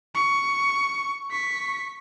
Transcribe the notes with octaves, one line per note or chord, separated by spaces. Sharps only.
C#6
C#6 B6